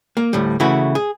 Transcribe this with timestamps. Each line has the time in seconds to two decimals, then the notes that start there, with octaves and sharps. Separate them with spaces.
0.17 A#3
0.33 D2 A2 G3
0.60 C#3 E3 A3 E4 F#4
0.95 G#4